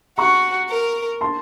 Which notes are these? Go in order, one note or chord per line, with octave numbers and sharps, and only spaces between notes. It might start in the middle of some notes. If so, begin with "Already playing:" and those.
F#4 A#5 C#6
A#4
A5 C6